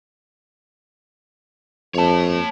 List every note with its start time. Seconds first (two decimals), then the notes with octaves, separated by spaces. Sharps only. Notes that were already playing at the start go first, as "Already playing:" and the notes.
1.95 F2 C#5 A5